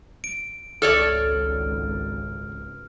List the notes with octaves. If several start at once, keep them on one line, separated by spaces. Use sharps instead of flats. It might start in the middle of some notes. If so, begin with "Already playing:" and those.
D7
G#1 C#2 A4 C#5 D5 F6